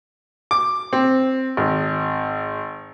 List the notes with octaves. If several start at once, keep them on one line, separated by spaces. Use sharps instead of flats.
D6
C4
G#1